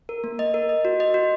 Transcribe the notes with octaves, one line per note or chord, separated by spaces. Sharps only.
A#4
A#3
D#5
A#4
D#5
F#4
D#5
F#4